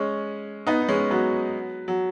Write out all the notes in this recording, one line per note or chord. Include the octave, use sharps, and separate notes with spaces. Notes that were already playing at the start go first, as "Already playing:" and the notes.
Already playing: G#3 C#4
B3 D#4
D#4
G#3 C#4
F#3 B3
F#3